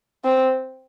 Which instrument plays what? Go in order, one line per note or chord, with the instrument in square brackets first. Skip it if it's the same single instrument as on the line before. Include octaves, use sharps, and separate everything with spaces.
[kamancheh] C4